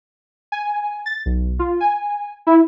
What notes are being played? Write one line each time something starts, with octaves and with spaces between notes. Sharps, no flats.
G#5
A6
B1
F4
G#5
E4